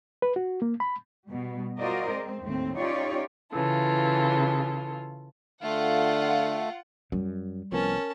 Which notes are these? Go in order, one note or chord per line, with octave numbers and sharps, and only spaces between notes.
B4
F#4
A#3
B5
B2 G3
F4 F#4 A#4 C5 D5 D#5
G#3 C4
D#2 A2 C4
C#4 D#4 F4 G4 C#5 D5
C#3 E3 F4 A4
D3 A3 F4 F5 F#5
F#2 G3
C2 F3 B3 C#4 A#4 A5